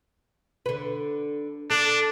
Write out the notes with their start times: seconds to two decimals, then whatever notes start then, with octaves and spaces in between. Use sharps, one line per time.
0.66 D3 B4
1.70 D4 A4